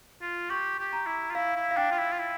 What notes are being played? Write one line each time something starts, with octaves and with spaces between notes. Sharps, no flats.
F4
G4 C#6
G4
A#5
E4
F4
E4 F5
E4
F5
D4 G5
F4
E4
F4
E4